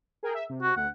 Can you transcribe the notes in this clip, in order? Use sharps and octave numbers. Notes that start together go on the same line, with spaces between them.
G#4 A#4 G5
E5
C3
F#4
D2 F#5